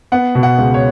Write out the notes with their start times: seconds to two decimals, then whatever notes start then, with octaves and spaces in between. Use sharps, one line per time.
0.12 B3 F#5
0.35 B2
0.43 F#5
0.58 C#2
0.74 C#5